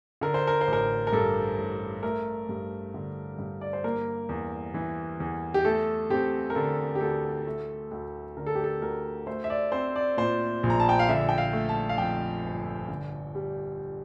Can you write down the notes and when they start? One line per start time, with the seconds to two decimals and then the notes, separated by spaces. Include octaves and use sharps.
0.21 D3 A#4
0.34 C5
0.47 A#4
0.61 C5
0.67 A1
0.73 A#4
1.07 A#4
1.13 G2 A4
1.58 A1
2.03 A3 A#4
2.49 G2
2.94 D3
3.38 G2
3.61 D5
3.73 C5
3.84 A#3 A#4
4.29 E2
4.74 E3
5.20 E2
5.54 G4
5.65 A3 A4
6.10 C4 G4
6.50 A#4
6.55 D3 A4
6.95 G4
7.01 D2 A4
7.47 A3
7.91 D2
8.37 D3 A#4
8.46 A4
8.55 G4
8.64 A4
8.81 D2 A#4
9.27 A3 C5
9.44 E5
9.50 D5
9.72 C4 C5
9.96 D5
10.17 A#2 C5
10.63 A#1
10.70 A#5
10.80 A5
10.89 G5
10.99 F5
11.09 D3 E5
11.29 G5
11.38 F5
11.53 A3
11.69 A5
11.89 F5
11.98 F2 G5
12.44 G1
12.89 D3
13.35 G3